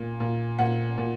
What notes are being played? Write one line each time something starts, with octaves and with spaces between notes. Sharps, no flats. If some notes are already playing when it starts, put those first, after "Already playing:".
Already playing: A#2
A#2
A#2 F#5
A#2